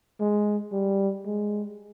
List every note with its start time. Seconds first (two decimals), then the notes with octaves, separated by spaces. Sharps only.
0.20 G#3
0.72 G3
1.26 G#3